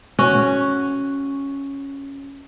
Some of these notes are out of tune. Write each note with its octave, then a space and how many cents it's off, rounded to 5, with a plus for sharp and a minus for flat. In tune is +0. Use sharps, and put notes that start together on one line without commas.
C#4 +0 F#4 +0